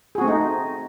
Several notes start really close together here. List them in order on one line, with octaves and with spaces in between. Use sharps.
G#4 F#4 C4 A3 D#4